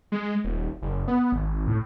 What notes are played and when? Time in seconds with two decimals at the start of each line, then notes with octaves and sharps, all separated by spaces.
0.12 G#3
0.44 D#1
0.82 F#1
1.08 B3
1.32 G#1
1.68 A2